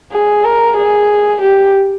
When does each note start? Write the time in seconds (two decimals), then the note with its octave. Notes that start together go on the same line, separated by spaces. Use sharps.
0.12 G#4
0.44 A#4
0.77 G#4
1.41 G4